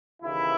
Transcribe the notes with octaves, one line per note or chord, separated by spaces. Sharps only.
D#2 C#3 E3 E4